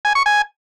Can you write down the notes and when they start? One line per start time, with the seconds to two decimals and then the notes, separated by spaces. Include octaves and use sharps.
0.05 G#5
0.15 C#6
0.26 G#5